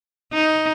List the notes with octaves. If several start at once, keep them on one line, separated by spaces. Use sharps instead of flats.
D#4